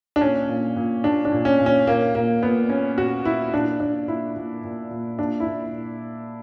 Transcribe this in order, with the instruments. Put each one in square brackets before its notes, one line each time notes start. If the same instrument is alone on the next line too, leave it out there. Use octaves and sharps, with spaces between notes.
[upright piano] D4
A#2 C#4
A#2
A#2
A#2 D4
D4
A#2
C#4
A#2
C#4
A#2 A#3
A#2 A#3
A#2 B3
A#2 C#4
A#2 F#4
A#2 E4
A#2 D4
A#2 D4
A#2 E4
A#2
A#2
A#2
A#2 D4
E4
A#2